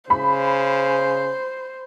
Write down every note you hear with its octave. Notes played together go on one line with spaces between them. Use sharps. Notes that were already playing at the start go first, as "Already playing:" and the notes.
C#3 C5 B5